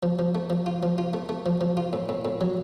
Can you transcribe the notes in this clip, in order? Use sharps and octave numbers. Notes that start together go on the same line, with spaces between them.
F3
F3
A3
F3
F4
F3
F4
A3
A3
F3
F3
F4
A2
A2
A2
F#3